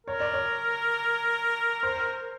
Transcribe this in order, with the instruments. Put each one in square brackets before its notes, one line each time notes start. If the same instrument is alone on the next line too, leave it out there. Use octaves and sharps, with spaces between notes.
[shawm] A#4 [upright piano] C#5
[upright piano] D5
C#5
C5